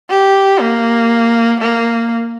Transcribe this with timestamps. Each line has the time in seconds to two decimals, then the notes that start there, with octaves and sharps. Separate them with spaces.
0.10 G4
0.60 A#3
1.60 A#3